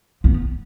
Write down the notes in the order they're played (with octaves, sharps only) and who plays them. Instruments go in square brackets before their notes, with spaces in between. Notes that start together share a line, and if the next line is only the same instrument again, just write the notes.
[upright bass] B3